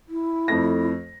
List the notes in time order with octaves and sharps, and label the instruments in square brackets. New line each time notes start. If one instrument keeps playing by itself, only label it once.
[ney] E4
[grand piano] F2 A3 A#6